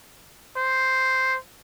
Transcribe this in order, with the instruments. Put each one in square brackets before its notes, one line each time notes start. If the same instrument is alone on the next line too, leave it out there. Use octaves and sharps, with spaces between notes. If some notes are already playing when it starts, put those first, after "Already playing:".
[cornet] C5